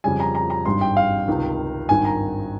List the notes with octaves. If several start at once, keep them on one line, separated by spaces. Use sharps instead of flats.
F2 C#3 G3 G#5
A#5
A#5
A#5
G#1 G2 G3 C6
G5
F5
C#2 C3 D#3
G#1 G2 D#3 G#5
A#5